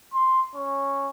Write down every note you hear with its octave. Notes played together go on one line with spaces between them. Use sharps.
C6
C#4